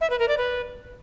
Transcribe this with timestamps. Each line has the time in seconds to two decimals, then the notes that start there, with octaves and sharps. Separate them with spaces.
0.01 E5
0.10 B4
0.19 A#4
0.28 D5
0.38 B4